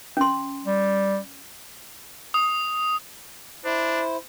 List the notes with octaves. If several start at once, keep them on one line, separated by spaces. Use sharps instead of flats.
C#4 C6
G3
D#6
D4 E4 C5